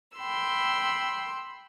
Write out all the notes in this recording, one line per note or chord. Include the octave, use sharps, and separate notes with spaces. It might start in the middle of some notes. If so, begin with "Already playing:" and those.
G5 B5 C6 E6